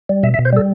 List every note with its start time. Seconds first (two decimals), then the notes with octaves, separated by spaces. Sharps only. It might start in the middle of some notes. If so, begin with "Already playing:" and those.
0.09 G3
0.23 B2 E5
0.34 E5
0.39 B2
0.45 C5
0.53 G3 A4